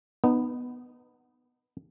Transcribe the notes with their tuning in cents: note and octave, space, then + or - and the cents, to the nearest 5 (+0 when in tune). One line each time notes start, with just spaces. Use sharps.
B3 +0 D#4 -25